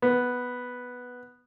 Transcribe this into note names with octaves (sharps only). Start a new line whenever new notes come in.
B3